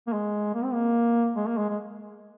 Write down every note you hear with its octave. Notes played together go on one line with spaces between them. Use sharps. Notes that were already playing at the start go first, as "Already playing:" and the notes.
A#3
G#3
A#3
C4
A#3
G#3
A#3
G#3
G#3